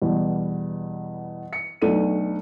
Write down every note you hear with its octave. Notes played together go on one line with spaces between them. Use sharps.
E2 B2 G3
C#7
B1 A3 D4 A4 D#7